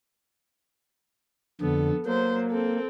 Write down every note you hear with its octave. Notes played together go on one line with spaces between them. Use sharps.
F2 D3 B3 A4
F#3 A#3 C5
C4 A4